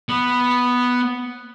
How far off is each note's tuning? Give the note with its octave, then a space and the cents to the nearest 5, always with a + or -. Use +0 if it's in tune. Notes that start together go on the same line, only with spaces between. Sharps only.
B3 +0